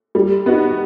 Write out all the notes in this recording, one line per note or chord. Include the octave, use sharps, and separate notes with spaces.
G3
B3 D#4 F#4